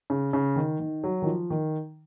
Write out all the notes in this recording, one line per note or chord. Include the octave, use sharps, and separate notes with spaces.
C#3
C#3
D#3
D#3
F#3
D#3
F3
D#3